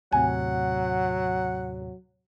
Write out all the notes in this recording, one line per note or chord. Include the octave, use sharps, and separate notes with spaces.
D#2 A2 C3 F#3 F#5 G#5